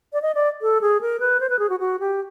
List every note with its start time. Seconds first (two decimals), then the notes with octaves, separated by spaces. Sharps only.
0.13 D5
0.22 D#5
0.35 D5
0.62 A4
0.81 G#4
1.01 A#4
1.20 B4
1.40 C5
1.49 B4
1.59 G#4
1.69 F#4
1.80 F#4
2.00 G4